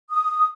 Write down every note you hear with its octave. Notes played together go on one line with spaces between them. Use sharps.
D#6